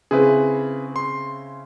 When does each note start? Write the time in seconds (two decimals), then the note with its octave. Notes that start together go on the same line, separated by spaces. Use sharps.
0.11 C#3 C4 E4 G#4 B4
0.96 C6